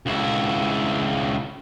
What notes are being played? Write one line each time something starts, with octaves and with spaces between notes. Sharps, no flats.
C#2 E4